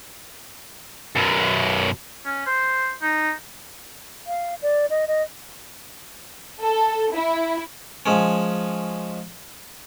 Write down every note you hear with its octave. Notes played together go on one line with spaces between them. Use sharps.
F#2 B2
C#4
C5
D#4
F5
D5
D#5
D#5
A4
E4
F3 G#3 C#4